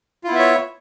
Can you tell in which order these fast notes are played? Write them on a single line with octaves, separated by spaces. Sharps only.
F4 E4 B3 E5 C#5